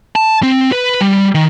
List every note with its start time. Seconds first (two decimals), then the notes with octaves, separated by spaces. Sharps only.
0.16 A5
0.43 C4
0.72 B4
1.01 G3
1.35 D#3